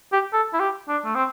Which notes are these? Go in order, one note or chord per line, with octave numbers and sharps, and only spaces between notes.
G4
A4
E4
G4
D4
A3
C4